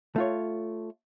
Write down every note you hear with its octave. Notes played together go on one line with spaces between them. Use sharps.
A3 F4 C#5